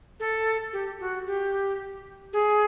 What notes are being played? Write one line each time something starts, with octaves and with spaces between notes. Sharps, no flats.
A4
G4
F#4
G4
G#4